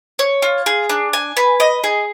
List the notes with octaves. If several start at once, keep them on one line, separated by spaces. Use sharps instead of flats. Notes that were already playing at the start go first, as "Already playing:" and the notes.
C#5
F4
G#4
D4
G#5
B4
D#5
G#4